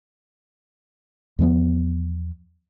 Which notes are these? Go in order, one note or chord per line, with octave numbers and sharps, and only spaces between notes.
E2 F3 G#3 B3